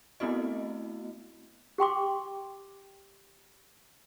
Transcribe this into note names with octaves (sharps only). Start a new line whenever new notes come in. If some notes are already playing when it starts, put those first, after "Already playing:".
A3 B3 C4 E4 F#4 D#5
G4 G5 C6 D6